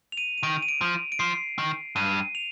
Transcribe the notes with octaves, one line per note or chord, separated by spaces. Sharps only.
F7
D#7
D#7
D#3 D7
D#7
D7
F3
D7
F3 C7
D#3
G2 D#7
F7